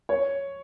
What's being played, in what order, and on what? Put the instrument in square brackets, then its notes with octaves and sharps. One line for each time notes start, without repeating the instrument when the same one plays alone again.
[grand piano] C#5